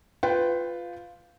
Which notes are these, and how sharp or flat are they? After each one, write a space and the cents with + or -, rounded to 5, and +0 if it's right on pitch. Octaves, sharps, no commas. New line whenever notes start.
F4 +0 B4 +15 G5 -5